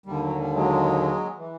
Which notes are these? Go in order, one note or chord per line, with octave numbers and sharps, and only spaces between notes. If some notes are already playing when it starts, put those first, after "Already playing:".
D#2 D3 G3
F#3
G3
F#3 G#3
E3